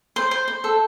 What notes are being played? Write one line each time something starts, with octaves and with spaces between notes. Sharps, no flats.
C5
C5
C5
A4